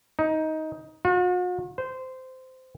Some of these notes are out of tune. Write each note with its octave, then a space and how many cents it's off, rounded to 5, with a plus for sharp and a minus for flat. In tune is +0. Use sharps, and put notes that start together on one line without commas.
D#4 +15
F#4 -45
C5 -15